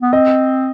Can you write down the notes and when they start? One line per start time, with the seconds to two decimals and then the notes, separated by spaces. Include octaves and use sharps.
0.02 B3
0.13 C4 D#5